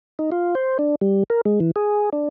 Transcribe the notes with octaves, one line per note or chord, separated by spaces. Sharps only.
D#4
F4
C5
D4
G3
A#4
G#3
E3
G#4
D4